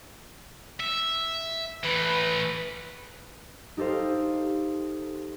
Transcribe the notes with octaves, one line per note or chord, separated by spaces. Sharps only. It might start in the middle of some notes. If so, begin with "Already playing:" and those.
E5
E3 A3 B4
D#4 G4 A4 C5 F5